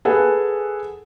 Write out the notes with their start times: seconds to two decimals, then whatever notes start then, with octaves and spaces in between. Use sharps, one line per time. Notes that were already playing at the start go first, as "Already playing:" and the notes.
0.05 G#4 A4 B4 F#5 G#5